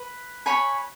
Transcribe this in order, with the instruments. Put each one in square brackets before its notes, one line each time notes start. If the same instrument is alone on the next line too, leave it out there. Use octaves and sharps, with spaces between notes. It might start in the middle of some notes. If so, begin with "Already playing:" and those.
Already playing: [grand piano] B4
[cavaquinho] C#5 G#5 B5